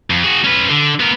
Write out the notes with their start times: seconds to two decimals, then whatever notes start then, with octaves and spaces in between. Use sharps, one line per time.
0.10 F2
0.24 F#4 G#4
0.44 C#4 B4
0.69 D3
1.00 B3 A#4